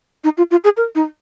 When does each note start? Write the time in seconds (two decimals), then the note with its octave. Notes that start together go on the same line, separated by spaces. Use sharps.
0.24 D#4
0.37 F4
0.51 F4
0.64 G#4
0.77 A#4
0.95 D#4